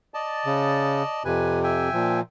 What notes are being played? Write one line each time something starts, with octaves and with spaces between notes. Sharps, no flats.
D5 D#5 A5
C#3
F2 C3 B4 G#5
E5 G5 G#5
A#2 F3